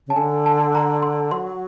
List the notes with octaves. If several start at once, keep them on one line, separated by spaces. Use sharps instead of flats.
C#3 A5
D3 G#5
A5
A#5
C6
F#3 C6